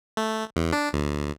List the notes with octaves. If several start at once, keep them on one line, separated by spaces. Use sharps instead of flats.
A3
E2
D4
D2